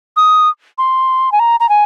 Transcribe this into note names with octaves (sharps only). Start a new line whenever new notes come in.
D#6
C6
G#5
A#5
A#5
G#5